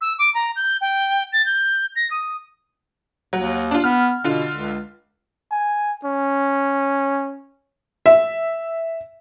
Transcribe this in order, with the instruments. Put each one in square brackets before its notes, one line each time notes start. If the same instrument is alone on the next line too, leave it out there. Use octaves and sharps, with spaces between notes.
[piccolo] E6
D6
A#5
G6
G5
A6
G6
A#6
D#6
[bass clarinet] D#2 [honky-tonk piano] F#3
[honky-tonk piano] D4 F4
[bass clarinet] B3 [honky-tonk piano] F6
[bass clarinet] B2 [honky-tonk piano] D3 F4
[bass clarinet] C#2
[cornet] G#5
C#4
[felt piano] E5